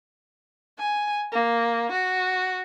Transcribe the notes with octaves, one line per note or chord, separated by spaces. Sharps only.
G#5
A#3
F#4